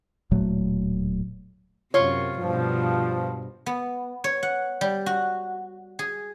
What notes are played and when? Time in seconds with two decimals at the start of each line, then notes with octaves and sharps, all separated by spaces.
0.31 D1 A#2 F#3 A3
1.94 F#2 C3 F4 C#5
2.39 G2 B2 F3
3.66 B3
4.24 C#5
4.43 F#5
4.81 G3
5.06 F#4
5.99 G#4